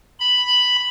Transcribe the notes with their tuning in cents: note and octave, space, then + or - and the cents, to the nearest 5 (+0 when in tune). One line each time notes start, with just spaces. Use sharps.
B5 +0